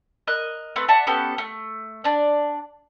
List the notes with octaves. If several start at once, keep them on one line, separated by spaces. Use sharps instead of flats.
A#4 D#5 F#6
A3 C4 B4
D5 E5 F#5 A5
B3 C#4 G4 A4
A3
D4 D5